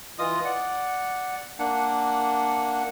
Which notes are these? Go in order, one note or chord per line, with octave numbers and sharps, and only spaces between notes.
E3 F4 D#5 D#6
D5 F#5
A#3 D4 F#5